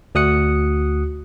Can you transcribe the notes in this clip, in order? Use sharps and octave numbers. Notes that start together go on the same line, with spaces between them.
D2 F#4 D#6 F#6 C#7